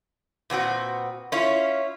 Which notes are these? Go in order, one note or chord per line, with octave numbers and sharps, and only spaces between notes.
A#2 B3 C4 F#4
C#4 E4 F4 C#5